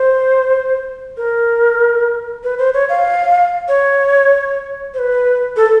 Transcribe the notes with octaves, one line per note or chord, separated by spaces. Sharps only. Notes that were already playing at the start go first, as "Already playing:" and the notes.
Already playing: C5
A#4
B4
C5
C#5
F5
C#5
C5
B4
A4